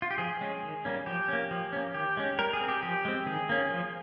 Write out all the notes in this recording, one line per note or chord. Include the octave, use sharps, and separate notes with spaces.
F4
G4
F3 G#4
G#3 C#4
D#3
G3 A#3 C#4
F3 G4
A#3 C#4
F3
A#3 C#4
D#3 G4
G#3 C#4
G3 A#4
G#4
C4
G4
F3 G4
G#3 C4
D#3 G#4
A#3 C#4
F3